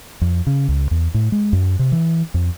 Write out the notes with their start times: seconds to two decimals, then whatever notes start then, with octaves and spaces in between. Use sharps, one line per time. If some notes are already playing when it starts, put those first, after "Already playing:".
0.21 F2
0.47 C#3
0.69 C#2
0.91 E2
1.14 A2
1.32 G#3
1.53 F#2
1.79 C3
1.92 E3
2.34 F2